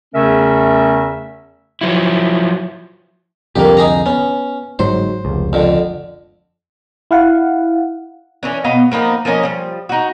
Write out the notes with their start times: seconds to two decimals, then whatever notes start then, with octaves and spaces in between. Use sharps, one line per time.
0.15 E2 C#3 A3 C#4 A#4 E5
1.81 F3 F#3 E4
3.56 C2 F2 D3 A#3 G4
3.77 D#4 G#4 A#5
4.06 B3 C#4
4.79 G1 G#2 F#3 C5
5.25 F1 C#2
5.53 F2 D3
7.11 E4 F5 F#5
8.43 E3 C#4 D4
8.64 B2 B3 D#5 F5
8.92 F3 A#3 B3 D#4
9.25 F3 A#3 C#4 D#5
9.43 F3 G3
9.89 D#4 F#4